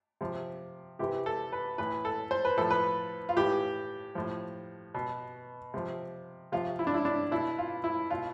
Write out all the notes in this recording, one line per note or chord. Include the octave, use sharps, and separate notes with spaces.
C3 F3
C3 E3 G4
A4
B4
A2 E3 B4
A4
C5
B4
A2 F3 A4
B4
F4
A2 E3 G4
A2 F3
B2
C3 F3
C3 F3 F4
E4
D4
E4
D4
B2 E4
F4
E4
B2 F4